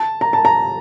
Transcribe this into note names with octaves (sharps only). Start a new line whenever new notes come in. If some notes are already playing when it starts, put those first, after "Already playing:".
Already playing: A5
A#5
A5
A#5